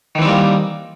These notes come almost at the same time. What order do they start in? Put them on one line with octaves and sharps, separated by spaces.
D#3 E3 C4 G3 A#3